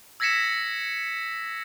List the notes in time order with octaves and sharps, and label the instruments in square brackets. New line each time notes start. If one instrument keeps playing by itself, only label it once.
[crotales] E6 G#6 A#6 B6 C#7 E7